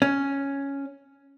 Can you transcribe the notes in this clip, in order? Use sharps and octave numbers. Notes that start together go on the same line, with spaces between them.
C#4